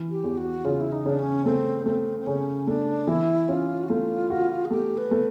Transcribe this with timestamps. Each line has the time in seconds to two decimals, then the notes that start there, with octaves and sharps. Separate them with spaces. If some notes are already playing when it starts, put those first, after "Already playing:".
Already playing: E3
0.10 G4
0.24 E2
0.37 F#4
0.64 C#3 F4
0.81 E4
0.92 D#4
1.06 C#3 D4
1.19 C#4
1.45 A3 C4
1.86 A3 C4
2.20 C4
2.26 C#3 C#4
2.67 A3 D4
3.07 E3 E4
3.49 C#4 F4
3.83 F#4
3.89 A3 F4
4.30 F#4
4.65 G#4
4.71 A3 G4
4.97 B4
5.11 A3